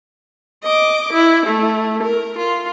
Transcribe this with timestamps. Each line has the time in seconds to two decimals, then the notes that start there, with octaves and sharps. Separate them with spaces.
0.64 D#5 D6
1.13 E4
1.46 A3
2.03 A#4
2.38 F4